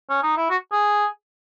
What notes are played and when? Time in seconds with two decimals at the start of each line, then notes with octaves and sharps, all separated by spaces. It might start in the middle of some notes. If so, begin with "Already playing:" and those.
0.10 C#4
0.23 D#4
0.37 E4
0.50 F#4
0.72 G#4